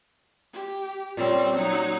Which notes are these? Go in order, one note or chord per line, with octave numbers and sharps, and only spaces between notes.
G4
A#2 G3 C4 C#4
F#3 D#4